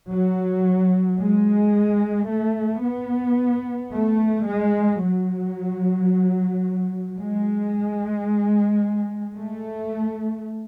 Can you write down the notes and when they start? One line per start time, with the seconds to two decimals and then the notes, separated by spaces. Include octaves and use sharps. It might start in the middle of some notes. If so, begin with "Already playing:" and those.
0.11 F#3
1.19 G#3
2.29 A3
2.84 B3
3.92 A3
4.46 G#3
5.01 F#3
7.18 G#3
9.37 A3